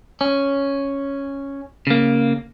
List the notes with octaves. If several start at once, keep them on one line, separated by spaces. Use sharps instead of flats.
C#4
C#3 A#3